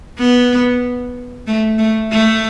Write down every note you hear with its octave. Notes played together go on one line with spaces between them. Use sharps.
B3
A3
A3
A3